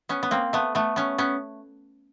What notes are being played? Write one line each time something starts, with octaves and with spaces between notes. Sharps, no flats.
B3 C#4
B3
A#3 C4
A3 B3
A3 B3
B3 C#4
B3 C#4